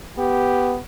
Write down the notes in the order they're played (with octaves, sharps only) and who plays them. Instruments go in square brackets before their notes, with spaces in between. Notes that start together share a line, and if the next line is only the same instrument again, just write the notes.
[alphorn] B3 [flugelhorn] G4